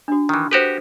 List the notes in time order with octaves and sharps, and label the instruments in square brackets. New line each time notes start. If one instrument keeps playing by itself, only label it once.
[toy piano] D4 F#4
[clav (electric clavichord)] D#3 E3
[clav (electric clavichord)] F#4 G4 B4 [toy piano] A4 C5